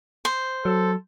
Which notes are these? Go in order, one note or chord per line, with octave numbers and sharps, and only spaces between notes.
C5
F#3 A4